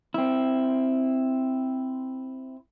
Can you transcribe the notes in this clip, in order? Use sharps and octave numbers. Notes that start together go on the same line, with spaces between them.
C4 E4